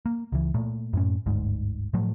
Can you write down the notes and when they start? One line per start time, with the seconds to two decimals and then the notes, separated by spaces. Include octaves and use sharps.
0.06 A#3
0.32 C#2 E3
0.54 A#2 A3
0.93 F#2 A2 C#4
1.26 G1 D2 G#2
1.94 A2 F3 F#3 A3